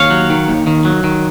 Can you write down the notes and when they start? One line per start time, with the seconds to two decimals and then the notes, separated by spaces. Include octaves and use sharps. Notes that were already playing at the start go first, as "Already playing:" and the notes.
Already playing: D#2 C#5 F5
0.10 F#3
0.30 D#3
0.48 D#2
0.67 D#3
0.85 F#3
1.04 D#3